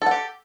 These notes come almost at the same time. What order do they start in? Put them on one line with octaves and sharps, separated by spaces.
A4 F#5 G4